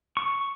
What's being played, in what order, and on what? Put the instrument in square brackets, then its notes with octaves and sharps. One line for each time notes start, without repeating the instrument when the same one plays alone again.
[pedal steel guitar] C#6